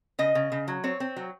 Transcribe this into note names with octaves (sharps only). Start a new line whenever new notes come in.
C#3 D#5
C#3
C#3
F#3
C4 C#5
C4
F#3